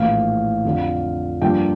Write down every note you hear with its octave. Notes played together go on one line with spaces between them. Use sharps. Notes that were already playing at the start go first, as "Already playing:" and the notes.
Already playing: A#1 A2 E3 F5
F2 D3 F3
G2 F3 A#3 D4 G5